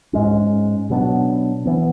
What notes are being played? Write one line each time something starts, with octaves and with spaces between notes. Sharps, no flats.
G#2 G#3 C#4
B2 F#3 B3 D4
E3 B3